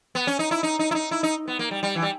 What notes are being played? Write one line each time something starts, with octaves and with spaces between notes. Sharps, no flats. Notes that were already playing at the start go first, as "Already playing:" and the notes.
B3
C#4
D#4
E4
D#4
D#4
E4
D#4
E4
D#4
B3
A#3
G3
G3
E3
G3